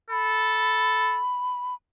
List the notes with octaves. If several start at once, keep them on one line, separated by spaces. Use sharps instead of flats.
A4 B5